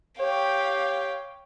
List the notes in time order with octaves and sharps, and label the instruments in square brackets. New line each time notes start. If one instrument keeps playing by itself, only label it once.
[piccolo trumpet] G4 [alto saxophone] C#5 [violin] F5 G5